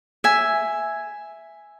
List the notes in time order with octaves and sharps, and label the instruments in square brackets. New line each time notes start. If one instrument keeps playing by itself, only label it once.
[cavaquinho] E5 G#5